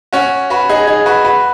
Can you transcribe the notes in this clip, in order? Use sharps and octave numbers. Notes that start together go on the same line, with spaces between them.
C#4 F#4
F#4 B4
D#4 G#4
D#4 G#4
F#4 B4
F#4 B4